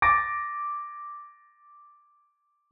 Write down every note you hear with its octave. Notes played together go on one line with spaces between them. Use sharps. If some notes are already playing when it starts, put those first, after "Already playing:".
D6 A6 A#6 D7